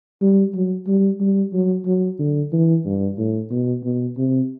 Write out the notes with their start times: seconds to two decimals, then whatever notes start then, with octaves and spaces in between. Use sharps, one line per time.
0.21 G3
0.55 F#3
0.87 G3
1.20 G3
1.53 F#3
1.86 F#3
2.19 D3
2.53 E3
2.85 G2
3.18 A2
3.51 B2
3.84 B2
4.17 C3